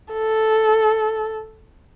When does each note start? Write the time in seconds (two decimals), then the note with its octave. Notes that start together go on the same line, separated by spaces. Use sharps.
0.13 A4